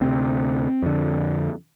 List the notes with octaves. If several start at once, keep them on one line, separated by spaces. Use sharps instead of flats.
D2 C3 C4
F2 D3